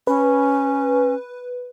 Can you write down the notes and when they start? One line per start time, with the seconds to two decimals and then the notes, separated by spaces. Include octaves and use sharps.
0.07 C#4 B4